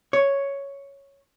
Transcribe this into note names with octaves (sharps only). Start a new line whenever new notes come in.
C#5